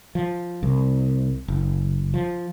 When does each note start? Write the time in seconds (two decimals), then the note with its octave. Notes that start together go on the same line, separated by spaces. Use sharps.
0.15 F3
0.63 C2
1.48 F#1
2.14 F3